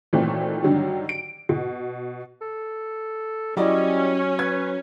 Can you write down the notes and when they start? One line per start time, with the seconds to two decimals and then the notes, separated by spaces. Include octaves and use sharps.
0.13 A#2 D#3 E3 F#3 A3 C4
0.64 G2 D3 D#3 F#3
1.09 D7
1.49 B2
2.41 A4
3.57 F#3 G3 C#4 E4 D5 D#5
4.39 B4 G#6